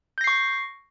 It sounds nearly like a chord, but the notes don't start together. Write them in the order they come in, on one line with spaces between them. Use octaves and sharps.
G6 A#6 C7 C#6